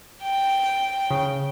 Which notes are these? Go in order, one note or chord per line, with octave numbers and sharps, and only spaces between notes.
G5
C#3